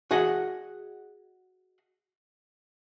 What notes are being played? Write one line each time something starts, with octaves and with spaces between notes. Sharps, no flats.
F#4 G#4 D#5 F#5